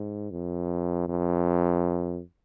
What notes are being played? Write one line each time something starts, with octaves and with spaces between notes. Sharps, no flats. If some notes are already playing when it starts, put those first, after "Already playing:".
Already playing: G#2
F2
F2